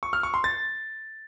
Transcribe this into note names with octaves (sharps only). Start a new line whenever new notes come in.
C#6
F6
C#6
C6
A6